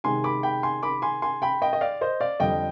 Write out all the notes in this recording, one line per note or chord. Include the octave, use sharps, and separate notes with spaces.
C3 D#3 G#3 G#5 C6
B5 D6
G5 B5
G#5 C6
B5 D6
G#5 C6
G#5 C6
G5 B5
D#5 G5
D#5
D5 F5
C5 D#5
D5 F5
F2 D3 G3 D#5 G5